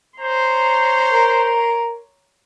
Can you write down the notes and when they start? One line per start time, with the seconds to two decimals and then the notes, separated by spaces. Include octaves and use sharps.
0.20 C5 C#5 A#5 C6
1.11 A#4